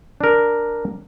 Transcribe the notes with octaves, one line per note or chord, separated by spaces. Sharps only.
D4 A#4